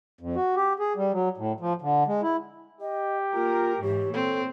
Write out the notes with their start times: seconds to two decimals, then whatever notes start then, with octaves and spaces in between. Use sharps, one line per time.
0.21 F2
0.36 F#4
0.56 G4
0.79 G#4
0.96 G3
1.12 F#3
1.37 A2
1.60 F3
1.82 D3
2.07 G#3
2.23 E4
2.81 G4 D#5
3.34 A#3 F4 A#4
3.82 G#2 E3 G4 C#5
4.14 A#2 C4 A4